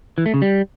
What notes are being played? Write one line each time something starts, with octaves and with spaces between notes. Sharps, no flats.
E3
A3
C#3
G3